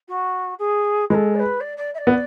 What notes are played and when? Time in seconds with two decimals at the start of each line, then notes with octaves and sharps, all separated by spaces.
0.08 F#4
0.59 G#4
1.10 G#3 B4
1.14 A4
1.35 D5
1.40 B4
1.61 D5
1.77 D5
1.94 E5
1.98 D5
2.07 B3